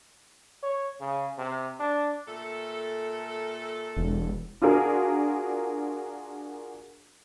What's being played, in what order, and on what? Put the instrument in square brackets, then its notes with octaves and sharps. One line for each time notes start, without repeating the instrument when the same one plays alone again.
[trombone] C#5
C#3
C3
D4
[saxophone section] A#2 A3 A4
[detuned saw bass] E1
[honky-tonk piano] D4 F4 F#4 G#4 A#4